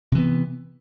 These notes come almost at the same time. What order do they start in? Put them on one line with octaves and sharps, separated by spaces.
C3 E3 B3